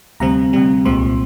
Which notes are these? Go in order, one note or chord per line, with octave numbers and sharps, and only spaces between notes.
D2 C3 G3 C4 A#5
D2 C3 G3 C4
C2 A#2 G#3 C4 C6